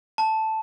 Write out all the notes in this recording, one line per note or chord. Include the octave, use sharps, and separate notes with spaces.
A5